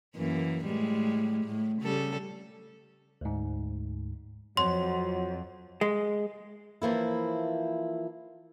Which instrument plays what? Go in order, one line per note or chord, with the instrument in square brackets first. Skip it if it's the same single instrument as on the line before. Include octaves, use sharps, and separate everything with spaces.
[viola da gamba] F#2 E3 A#3
A2 G3 G#3
A2
C#3 G3 A4
[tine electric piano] D2 G#2
[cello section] F2 [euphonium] F#3 [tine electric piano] C#5 F#5 [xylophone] C6
[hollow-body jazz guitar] G#3
[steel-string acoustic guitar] E3 F3 A#3 E4